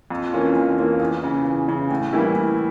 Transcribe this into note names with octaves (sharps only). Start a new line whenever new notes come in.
F2
E3 A#3 C#4 F4
F2
E3 A#3 C#4 F4
E2
C#3 E3
E2
C#3 E3
A2
E3 G3 A#3 E4
A2